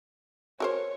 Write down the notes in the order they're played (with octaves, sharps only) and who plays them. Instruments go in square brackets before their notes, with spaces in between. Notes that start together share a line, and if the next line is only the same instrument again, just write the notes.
[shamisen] F#4 A#4 C5 [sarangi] C#5